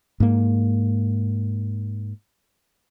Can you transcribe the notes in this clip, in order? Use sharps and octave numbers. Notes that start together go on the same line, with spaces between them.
G#2 A#3